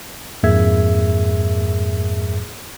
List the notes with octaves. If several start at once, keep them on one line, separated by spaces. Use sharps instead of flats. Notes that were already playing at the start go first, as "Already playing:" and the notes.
F2 G#2 A#3 G#4 E5 G#6